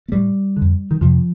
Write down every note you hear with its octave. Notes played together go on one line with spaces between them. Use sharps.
A3
A2 G3
F2 D3
D#3
F2 C3 F3